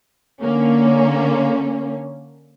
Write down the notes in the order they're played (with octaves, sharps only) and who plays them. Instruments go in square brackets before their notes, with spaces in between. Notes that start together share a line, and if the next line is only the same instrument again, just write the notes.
[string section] D3 A#3 C#4